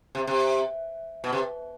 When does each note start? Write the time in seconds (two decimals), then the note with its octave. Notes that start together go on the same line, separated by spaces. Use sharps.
0.15 C3
0.27 C3
1.24 B2
1.33 C3